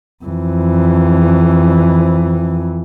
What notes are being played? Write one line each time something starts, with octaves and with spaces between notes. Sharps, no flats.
F2 E3